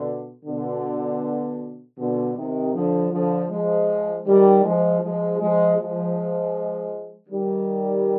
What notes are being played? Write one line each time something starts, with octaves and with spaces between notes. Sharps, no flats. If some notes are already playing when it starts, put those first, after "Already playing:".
Already playing: B2 D3
B2 D3
B2 D3
C3 D#3
D3 F3
D3 F3
F3 G#3
D#3 G3
F3 G#3
F3 G#3
F3 G#3
F3 G#3
D#3 G3